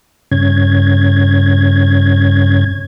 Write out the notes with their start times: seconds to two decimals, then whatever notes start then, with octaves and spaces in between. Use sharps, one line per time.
0.32 G2 C#3 C#4 G#6